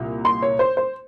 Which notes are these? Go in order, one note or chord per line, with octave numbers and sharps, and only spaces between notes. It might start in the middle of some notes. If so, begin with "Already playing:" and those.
Already playing: C2 A#2
C6
C#5
C5
C5